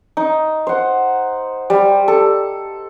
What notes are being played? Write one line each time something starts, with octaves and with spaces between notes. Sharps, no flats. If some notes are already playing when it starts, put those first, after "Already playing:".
D#4
C5 F#5
G3
A4